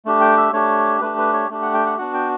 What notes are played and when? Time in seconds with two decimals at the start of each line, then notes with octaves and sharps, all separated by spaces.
0.05 A3 D4 G4
0.21 G5
0.37 E5
0.53 A3 D4 G4 C#5
1.01 A3 D4 G4 B4
1.18 B4
1.33 C#5
1.50 A3 D4 G4
1.62 F#5
1.74 G5
1.86 F#5
1.98 B3 D4 F#4 F#5
2.14 G5